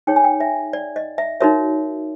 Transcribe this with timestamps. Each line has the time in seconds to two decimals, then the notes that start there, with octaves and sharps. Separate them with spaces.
0.07 D#4 G#4 C#5 G5
0.16 G#5
0.24 G5
0.40 E5
0.73 D5
0.96 D#5
1.18 E5
1.41 D#4 F#4 A#4 C#5 E5